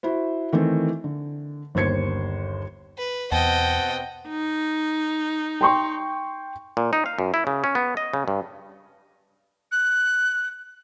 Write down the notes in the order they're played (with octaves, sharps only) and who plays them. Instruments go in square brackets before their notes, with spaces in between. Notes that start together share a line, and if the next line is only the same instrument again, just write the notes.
[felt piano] E4 F#4 C5
D#3 E3 A3 C4
D3
G1 D#2 C5 G#6 C#7
[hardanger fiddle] B4
[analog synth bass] E2 [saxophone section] B2 C4 F#5 [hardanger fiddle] D#5 G5 [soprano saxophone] A5
[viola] D#4
[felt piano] G5 C6 C#6
[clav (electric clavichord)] A#2
D#4
F5
F#2
E4
C#3
C#4
B3
D#5
C#3
G2
[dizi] F#6